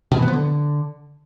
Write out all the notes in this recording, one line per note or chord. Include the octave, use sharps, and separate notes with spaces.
B2
E3
B3
F3
D3